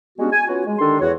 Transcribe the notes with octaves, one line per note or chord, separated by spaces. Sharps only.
G3 G#3 B3 C#4 D4 F#4
G#5
B3 C#4 F4 F#4
G#3
D3 D#3 D4 G4 A4 C6
E2 F#4 C#5